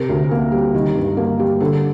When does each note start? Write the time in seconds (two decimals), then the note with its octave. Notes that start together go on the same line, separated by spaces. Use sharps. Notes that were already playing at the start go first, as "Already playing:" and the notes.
Already playing: C3 A#4
0.09 D2
0.31 A#3
0.52 G3
0.74 D#3
0.96 G2
1.17 A#3
1.40 G3
1.60 D3 A4